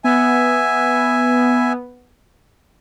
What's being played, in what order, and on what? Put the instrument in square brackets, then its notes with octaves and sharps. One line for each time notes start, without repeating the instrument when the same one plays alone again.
[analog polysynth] B3 [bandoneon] E5 G#5